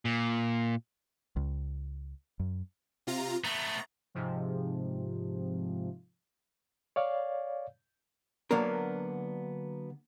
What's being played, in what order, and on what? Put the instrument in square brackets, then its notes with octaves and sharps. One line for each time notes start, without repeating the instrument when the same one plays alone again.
[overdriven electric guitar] A#2
[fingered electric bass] C#2
F#2
[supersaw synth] C3 F4 A#5
[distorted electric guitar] A3 B3 [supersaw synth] A#5
[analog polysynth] G#2 C3 F3
[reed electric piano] C#5 D5 F5
[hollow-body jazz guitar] D3 F#3 A#3 B3 D4 A#4